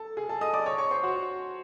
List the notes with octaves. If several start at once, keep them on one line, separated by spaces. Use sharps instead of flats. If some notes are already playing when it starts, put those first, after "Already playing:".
Already playing: A4 A5
G#4 G#5
A4 A5
D#5 D#6
D5 D6
C#5 C#6
C#5 C#6
C5 C6
F#4 F#5